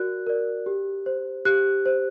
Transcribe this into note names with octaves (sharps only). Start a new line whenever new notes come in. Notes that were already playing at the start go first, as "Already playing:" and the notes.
Already playing: F#4 A#4 D5 F#6
A#4 D5
G4
C5
G4 F#6
C5